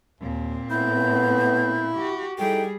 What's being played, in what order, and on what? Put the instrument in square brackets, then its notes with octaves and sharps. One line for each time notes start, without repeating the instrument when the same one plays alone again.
[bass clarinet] D#2 [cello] A#2 C4
[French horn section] A2 B3 [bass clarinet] E4 [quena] G6
[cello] F#4 G4
[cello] G3 G#4 [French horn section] D#4 E4 A4 [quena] G5